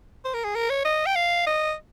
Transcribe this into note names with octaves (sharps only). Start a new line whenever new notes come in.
C5
A#4
G#4
A#4
C#5
D#5
G5
F5
D#5